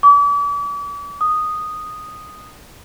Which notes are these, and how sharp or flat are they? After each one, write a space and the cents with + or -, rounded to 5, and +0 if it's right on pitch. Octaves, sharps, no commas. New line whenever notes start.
D6 -40
D#6 -10